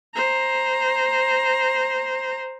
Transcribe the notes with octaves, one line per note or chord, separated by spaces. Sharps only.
C5 A#5